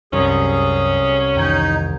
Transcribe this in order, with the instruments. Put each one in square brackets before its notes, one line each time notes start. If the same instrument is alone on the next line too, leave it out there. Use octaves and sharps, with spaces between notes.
[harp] C2 [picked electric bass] F#2 [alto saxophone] C#4 [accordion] G#4
[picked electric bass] F2 D#3 E3 [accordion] D#4 [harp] G5 G6 G#6